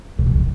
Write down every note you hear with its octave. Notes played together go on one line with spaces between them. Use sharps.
C3
B2
C3